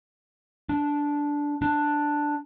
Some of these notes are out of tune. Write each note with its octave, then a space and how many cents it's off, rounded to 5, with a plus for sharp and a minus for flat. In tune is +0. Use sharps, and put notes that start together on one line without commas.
D4 -10
D4 +5